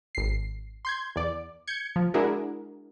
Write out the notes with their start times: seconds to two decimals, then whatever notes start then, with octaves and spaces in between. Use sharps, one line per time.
0.15 G#1 C7
0.85 C6 G6 G#6
1.16 E2 D5
1.67 G6 G#6 C#7
1.96 F3
2.14 G#3 D4 E4 F#4 G#4 A#4